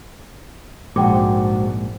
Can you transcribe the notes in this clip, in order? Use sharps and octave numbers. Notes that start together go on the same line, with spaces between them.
A#1 G#2 G#3 F#4 C5 F#5 G5 D6